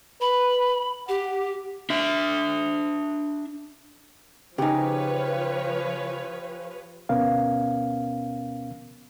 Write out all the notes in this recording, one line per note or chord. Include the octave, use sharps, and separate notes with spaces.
B4 B5
G4 F#5
D4 E5
C#3 F3 D#4 G4 B4 C#5 G#5
D2 B2 B3 C#4 A#4 F5